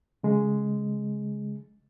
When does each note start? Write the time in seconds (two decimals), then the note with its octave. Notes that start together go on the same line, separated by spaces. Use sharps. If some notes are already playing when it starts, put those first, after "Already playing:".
0.23 C#3 G#3